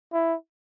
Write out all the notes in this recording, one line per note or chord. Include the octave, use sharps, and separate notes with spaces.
E4